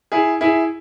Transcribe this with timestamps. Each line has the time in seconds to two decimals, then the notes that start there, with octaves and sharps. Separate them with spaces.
0.12 E4 G#4
0.41 E4 G#4